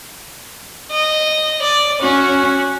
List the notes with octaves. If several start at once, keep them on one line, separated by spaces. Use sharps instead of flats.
D#5
D5
C#4 F#4